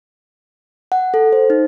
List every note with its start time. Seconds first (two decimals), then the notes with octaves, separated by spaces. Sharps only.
0.92 F#5
1.14 A4
1.33 C5
1.50 D#4